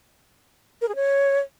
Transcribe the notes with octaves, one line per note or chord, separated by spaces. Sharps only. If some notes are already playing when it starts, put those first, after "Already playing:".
A#4
G#4
C#5